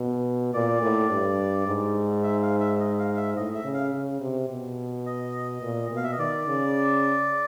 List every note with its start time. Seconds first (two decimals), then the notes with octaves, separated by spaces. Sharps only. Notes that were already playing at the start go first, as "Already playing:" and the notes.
Already playing: B2
0.54 A#2 D5
0.82 A2
1.10 G2
1.67 G#2
2.24 E5
2.42 F5
2.60 E5
2.80 D#5
2.99 F5
3.14 F5
3.17 E5
3.36 A2 D#5
3.55 E5
3.64 C#3
3.74 F5
3.93 C#3
4.20 C3
4.49 B2
5.06 D#5
5.62 A#2
5.91 B2
5.97 F5
6.04 E5
6.12 D#5
6.19 D#3 D5
6.47 C#3